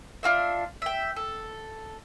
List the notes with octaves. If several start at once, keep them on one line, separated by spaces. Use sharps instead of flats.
D4 F4 F#4 E5
E5 G5
A4